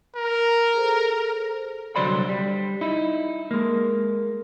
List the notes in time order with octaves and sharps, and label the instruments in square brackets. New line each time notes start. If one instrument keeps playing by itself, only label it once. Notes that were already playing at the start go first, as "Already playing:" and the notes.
[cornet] A#4
[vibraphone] G#4 A4 C5
[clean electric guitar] C2 D3 F#3 C5 D5 B5
G3
D#4 E4
G#3 A#3